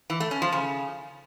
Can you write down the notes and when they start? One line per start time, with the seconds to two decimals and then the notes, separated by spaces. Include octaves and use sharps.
0.10 E3
0.20 A3
0.31 C#4
0.42 F3
0.52 C#3